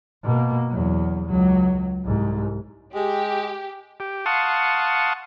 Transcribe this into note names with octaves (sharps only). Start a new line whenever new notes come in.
B2 A#3
E2 F#3
C#2 F#3
C2 G#2
G#3 G4
G4
F5 F#5 A5 C6 C#6 D#6